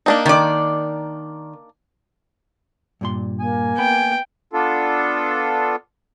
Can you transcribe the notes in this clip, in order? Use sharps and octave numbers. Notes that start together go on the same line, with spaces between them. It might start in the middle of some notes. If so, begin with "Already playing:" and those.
A#3 D4 D#4
D#3 D5
G2 A#2 C6
A#3 G#5
B3 G5 B5
B3 D4 F4 A4